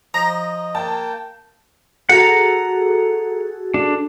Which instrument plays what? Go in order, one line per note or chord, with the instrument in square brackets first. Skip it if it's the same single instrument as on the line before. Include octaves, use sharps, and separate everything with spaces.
[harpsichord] F3 [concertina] D#5 [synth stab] A#5
[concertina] A#3 G5 [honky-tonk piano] A5
[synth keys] F#4 G#4 A4 [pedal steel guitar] F#5 A#5
[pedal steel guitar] D4